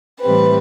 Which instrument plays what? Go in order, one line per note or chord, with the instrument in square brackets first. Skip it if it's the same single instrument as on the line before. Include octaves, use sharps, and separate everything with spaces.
[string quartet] A2 E3 G3 C4 B4